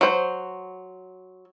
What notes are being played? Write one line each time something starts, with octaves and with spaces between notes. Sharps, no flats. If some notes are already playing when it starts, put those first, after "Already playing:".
F#3 C5